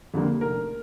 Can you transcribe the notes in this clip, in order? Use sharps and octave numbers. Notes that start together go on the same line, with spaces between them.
F2 D3 G3 A#3
F1 A#4